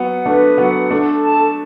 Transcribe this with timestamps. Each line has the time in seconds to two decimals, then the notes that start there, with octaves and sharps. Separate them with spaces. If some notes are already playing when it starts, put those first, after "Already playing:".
Already playing: F#3 B3 F#5
0.26 A3 D4 B4
0.58 F#3 B3 F#5
0.90 A3 D4 A4
1.23 A5